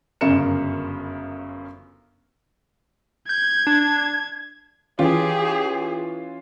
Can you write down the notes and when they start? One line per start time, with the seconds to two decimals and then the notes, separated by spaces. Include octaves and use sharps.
0.21 G1 F#2 C#3 A#4 C#7 E7
3.29 G6 G#6
3.67 D4
4.99 E3 C#4 F4 G4 G#4